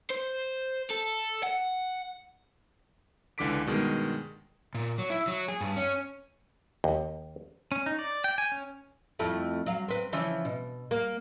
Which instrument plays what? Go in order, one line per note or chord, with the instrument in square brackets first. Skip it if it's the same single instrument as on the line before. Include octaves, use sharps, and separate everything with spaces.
[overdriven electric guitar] C5
A4
F#5
[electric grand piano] C#2 D3 E3 D6 B6 D7
G2 B2 D#3 G#3
[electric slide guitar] A#2
F#3
E4
F#3
G#4
G2
C#4
[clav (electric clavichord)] D#2
[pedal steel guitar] C#4
D#4
D5
G5
G#5
C#4
[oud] F2 A3 E4
F#3 F5
C4 B4
C#3 E3 F3
B2
A#3